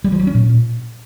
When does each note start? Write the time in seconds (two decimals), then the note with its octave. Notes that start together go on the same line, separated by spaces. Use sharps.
0.04 G3
0.12 F3
0.19 F#3
0.27 C#4
0.35 A#2